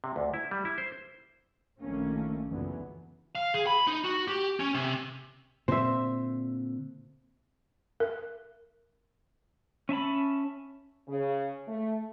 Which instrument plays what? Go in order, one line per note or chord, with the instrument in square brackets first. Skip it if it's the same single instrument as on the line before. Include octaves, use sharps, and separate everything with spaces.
[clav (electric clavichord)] C3
D2
E4
G3
E4
C5
[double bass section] A#1 D#3 A3 A#3 C#4
F#1 C#2 D3 E3 F#3 B3
[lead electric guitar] F5
G#4
B5
D#4
F#4
G4
C#4
C3
[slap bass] A#2 D3 C4 [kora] C5 E5
[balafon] A#4
[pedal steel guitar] C#4 E5 A5 B5
[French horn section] C#3
A3